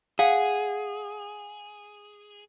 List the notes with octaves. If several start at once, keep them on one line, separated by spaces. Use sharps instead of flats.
G#4 F5 F#5